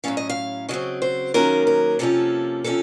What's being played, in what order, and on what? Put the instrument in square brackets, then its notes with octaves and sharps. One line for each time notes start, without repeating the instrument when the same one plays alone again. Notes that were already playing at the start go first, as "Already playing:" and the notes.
[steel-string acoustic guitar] A2 F#3 A3 C#4 F5
D#5
F5
C#3 F#3 C4 D#5
C5
D#3 F#3 A#3 C#4 A#4
A#4
C3 F3 A#3 C#4 A4
C3 F3 A#3 C#4 A4